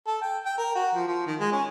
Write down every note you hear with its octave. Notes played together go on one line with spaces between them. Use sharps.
A4
G5
G5
A#4
F#4
F3
F3
D#3
G#3
C#4